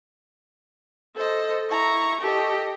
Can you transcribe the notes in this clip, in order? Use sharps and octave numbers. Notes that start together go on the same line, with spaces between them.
A4 C5 D#5
E4 A#5 C#6
G4 A4 D#5